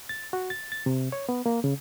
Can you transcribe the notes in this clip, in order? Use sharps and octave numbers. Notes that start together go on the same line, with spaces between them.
A6
F#4
A6
A6
C3
C#5
B3
A#3
C#3